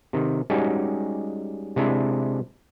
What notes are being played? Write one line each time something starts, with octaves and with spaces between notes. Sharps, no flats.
C3 D#3
G3 G#3 C#4 D#4 F#4 G4
C3 G#3 D4 E4